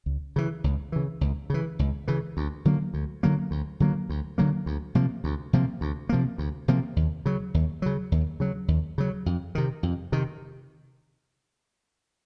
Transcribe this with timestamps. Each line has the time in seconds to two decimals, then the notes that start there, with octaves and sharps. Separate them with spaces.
0.06 C#2
0.36 C#3 E3
0.64 C#2
0.92 C#3 E3
1.21 C#2
1.50 C#3 E3
1.79 C#2
2.08 C#3 E3
2.37 D2
2.65 D3 F#3 A#3
2.94 D2
3.23 D3 F#3 A#3
3.51 D2
3.80 D3 F#3 A#3
4.09 D2
4.38 D3 F#3 A#3
4.66 D2
4.95 C3 F3 A#3
5.24 D2
5.53 C3 F3 A#3
5.81 D2
6.09 C3 F3 A#3
6.38 D2
6.68 C3 F3 A#3
6.96 D#2
7.26 C#3 F#3
7.54 D#2
7.82 C#3 F#3
8.12 D#2
8.40 C#3 F#3
8.68 D#2
8.98 C#3 F#3
9.26 F2
9.55 C3 D#3
9.83 F2
10.12 C3 D#3